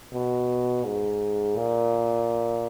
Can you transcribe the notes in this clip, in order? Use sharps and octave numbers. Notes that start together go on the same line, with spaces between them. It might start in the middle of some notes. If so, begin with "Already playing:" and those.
B2
G#2
A#2